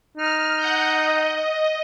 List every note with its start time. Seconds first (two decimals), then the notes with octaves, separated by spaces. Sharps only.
0.17 D#4 F6
0.57 F#5 G6
0.95 D#5